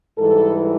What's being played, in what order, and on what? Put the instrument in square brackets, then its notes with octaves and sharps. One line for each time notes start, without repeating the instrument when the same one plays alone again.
[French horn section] G#2 E3 G3 A4